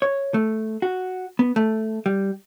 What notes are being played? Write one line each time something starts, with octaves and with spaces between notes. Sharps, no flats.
C#5
A3
F#4
B3
A3
G3